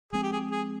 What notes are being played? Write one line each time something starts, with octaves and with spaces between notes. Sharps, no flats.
F3 G#3 C4 G#4
G4
G#4
G#4